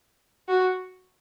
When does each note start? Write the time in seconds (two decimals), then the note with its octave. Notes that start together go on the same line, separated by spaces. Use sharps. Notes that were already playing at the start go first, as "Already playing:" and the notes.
0.48 F#4